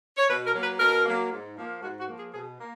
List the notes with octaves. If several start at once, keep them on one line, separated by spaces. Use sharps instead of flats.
C#5
B2 B4
A#4
F#3 A#3
B4
B2 A#4
F#3 A#3
G#2
F3 A#3
G#2 F#4
F#4
F3 A#3
G#4
B2 G#4
A#3